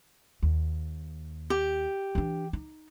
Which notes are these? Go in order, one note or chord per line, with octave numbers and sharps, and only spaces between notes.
D#2
G4
E3 D4
D#4